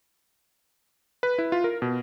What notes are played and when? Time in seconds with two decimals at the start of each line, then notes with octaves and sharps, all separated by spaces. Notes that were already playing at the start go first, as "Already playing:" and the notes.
1.23 B4
1.38 E4
1.52 F4
1.64 A#4
1.82 B2